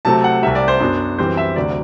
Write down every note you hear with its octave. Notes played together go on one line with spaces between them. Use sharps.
C3 F#3 A3 A5
F#5
C2 C3 G3 E5
D5
C5
F#2 F#3 B3 D4
F#2 E3 G3 C4 C5
E5
D2 C3 F#3 D5